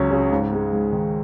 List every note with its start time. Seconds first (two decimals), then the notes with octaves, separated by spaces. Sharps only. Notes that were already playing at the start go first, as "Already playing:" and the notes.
Already playing: C#2 F#3 C#4
0.11 C#3
0.31 G#2
0.52 G#3
0.73 G#2
0.92 D#3